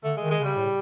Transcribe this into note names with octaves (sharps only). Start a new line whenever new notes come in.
D3 A3
G#3
D#3
G#3
C#3 G3
A2